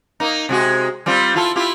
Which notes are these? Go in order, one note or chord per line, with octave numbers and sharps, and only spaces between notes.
A#3 D#4
C3 G#3 F#4
G3 C4 F4
E4 F4 A4
E4 F4 G4